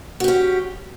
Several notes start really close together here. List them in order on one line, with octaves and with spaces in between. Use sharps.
F#4 G4 C#4